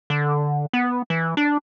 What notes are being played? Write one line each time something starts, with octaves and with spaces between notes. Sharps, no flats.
D3
B3
E3
D4